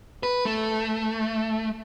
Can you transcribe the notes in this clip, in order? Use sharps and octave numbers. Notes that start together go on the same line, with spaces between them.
B4
A3